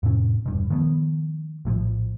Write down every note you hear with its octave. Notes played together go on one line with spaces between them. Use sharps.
F2 A2 C3 C#4
E1 G2 B2
D#3 F3 A3 B3
A#1 A2 E3 F3